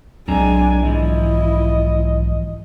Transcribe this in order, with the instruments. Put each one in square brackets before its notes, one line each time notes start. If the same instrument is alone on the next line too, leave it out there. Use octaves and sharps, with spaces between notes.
[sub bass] B1 [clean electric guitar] F#3 C4 A#5 [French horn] G#3 [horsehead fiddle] D4 G#5
[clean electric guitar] G#2 E3 F3 [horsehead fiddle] E4 [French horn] D#5